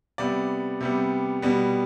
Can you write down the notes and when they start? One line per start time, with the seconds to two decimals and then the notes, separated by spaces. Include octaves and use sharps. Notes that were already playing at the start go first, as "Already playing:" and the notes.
0.18 C3 G3 B3 D5
0.81 C3 G3 B3
1.42 B2 G3 B3